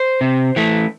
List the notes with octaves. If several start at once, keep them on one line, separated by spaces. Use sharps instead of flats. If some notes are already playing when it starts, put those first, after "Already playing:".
Already playing: C5
C3
E3 A3